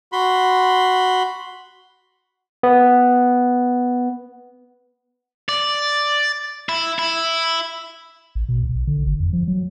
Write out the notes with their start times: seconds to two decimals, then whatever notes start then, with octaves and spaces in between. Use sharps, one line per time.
0.12 F#4 B5 C6
2.63 B3
5.49 D5
6.69 E4
6.99 E4
8.35 A1
8.49 B2
8.63 C2
8.75 B1
8.87 D3
9.06 G1
9.20 F2
9.33 F3
9.48 F#3